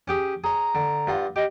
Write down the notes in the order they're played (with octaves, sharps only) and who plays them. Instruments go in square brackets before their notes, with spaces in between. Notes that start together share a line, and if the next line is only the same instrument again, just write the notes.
[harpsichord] C#4 G4 G#4
[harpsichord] G#4 C#5 [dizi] A#5
[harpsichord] D3
G2 F4 F#5
[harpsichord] G4 [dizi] D#5